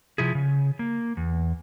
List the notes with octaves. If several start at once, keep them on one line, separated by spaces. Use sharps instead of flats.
C3 F3 E4 G#4
C#3
A#3
E2